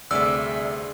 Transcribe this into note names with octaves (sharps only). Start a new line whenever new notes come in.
D2 G2 C3 G#4 D5 E5 C6 E6